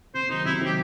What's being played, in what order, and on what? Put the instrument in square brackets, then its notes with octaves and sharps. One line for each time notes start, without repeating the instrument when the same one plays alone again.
[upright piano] C3 [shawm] C5
[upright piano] D#3 F#3 [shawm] D#4
[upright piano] C3 [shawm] E4
[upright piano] D#3 F#3 [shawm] G4